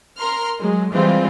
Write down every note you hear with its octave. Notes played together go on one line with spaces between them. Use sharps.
A#4 A#5 C6 F6
F#3 G#3
E3 G3 G#3 C4 F4